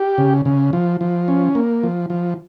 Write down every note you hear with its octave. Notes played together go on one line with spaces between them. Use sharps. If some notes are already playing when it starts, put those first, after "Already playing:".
Already playing: G4
C#3
C#3
F3
F3
C#4
A#3
F3
F3